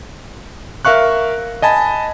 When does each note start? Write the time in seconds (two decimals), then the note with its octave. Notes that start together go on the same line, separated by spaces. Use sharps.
0.85 A#4 E5 F5 C#6 F#6
1.62 D#5 G#5 A5 B5